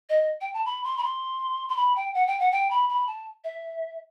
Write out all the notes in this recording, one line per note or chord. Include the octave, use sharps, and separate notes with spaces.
D#5
G5
A5
B5
C6
B5
C6
C6
B5
G5
F#5
G5
F#5
G5
B5
B5
A5
E5